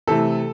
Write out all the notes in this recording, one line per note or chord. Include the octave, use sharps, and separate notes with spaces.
C3 E3 A3 A4